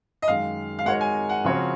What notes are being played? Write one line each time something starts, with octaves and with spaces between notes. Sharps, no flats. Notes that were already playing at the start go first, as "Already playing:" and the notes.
D#5
F#2 D#3 G#3 F5
F5
G#3 D#4 F#4 A#4 C#5 F#5
G#5
F#5
C#3 F3 C4 F#4 C#5